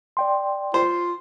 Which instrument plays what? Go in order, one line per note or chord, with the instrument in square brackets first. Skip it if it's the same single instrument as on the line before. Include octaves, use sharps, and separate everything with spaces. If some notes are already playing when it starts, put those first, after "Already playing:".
[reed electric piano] D5 G5 C6
[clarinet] F4 [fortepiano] C5